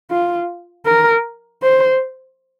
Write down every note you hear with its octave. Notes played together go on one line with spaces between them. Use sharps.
F4
A#4
C5